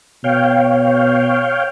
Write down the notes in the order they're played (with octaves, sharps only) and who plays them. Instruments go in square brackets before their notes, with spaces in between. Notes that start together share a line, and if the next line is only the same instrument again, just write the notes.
[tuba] B2 [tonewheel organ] C#5 F5 G5